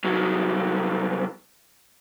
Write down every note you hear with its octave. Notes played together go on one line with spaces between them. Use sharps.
C2 F#3